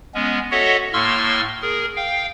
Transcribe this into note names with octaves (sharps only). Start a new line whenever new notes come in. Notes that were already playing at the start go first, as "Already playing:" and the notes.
G#3 B3 C#4
F#4 A4 C#5 D#5 E5 F#5
A2 A#3 C6 C#6 E6 F6
G#4 A#4
F5 G5